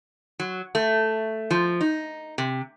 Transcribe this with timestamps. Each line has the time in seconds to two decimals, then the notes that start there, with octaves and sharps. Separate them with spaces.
0.40 F#3
0.75 A3
1.51 F3
1.81 D#4
2.38 C3